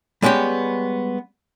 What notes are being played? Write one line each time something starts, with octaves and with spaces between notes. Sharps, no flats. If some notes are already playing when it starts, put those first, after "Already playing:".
G3 G#3 B3 C#4 G4